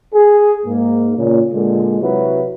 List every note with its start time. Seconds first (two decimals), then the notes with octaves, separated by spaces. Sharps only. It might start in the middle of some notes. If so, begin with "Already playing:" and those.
0.14 G#4
0.66 G#2 A#3
1.17 A#2 C#3
1.53 A#2 D3 G#3
2.01 C3 F#3 E4 F#4 B4